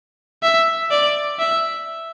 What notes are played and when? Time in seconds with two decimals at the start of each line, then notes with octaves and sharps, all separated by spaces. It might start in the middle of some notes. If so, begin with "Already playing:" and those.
0.43 E5
0.91 D5
1.39 E5